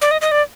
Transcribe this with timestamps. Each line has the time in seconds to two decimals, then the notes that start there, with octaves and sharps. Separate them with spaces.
0.01 D5
0.11 D#5
0.21 D#5
0.32 D5